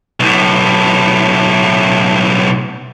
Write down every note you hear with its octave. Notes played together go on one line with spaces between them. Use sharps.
B1 A2